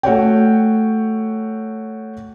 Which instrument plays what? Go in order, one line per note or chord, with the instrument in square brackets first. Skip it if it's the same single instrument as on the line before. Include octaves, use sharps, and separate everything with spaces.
[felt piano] A3 F#4 C#5 G5